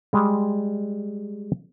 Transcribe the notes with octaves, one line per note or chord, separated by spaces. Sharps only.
G3 G#3